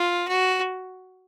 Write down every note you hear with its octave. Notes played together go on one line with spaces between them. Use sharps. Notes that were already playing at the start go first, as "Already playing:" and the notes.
Already playing: F4
F#4